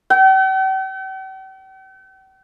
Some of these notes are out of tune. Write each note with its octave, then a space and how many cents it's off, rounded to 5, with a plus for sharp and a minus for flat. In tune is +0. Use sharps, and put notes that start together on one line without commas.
G5 -45